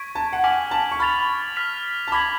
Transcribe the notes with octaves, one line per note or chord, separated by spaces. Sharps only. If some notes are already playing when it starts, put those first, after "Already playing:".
Already playing: C#6 G#6 B6 D7
A5
F#5
G#5 D6 F6 B6 F#7
A5
C#6
B5 F6 A6 F7
F6 B6 F7
A5
B5 D6 G#6 B6 F#7